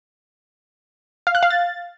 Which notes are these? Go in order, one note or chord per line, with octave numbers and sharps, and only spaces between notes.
F5
F#6
F5
A6